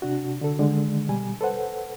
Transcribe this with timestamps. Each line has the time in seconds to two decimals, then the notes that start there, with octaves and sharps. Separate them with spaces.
0.02 C3 D4 F#4
0.41 D3 A4
0.59 D3 D#3 G#3
1.09 B2 G3 G#5
1.41 A4 B4 C5 F#5